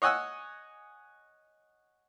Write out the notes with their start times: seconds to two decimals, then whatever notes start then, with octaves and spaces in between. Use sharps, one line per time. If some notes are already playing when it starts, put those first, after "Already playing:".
0.02 C#5 D#5 F#5 G#5 E6 F#6